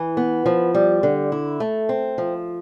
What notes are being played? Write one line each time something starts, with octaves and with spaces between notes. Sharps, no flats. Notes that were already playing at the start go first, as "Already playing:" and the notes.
Already playing: E3
B3
F3
G3
D3
E4
A3
C4
F3